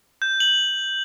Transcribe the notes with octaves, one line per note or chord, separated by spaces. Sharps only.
G6
F#7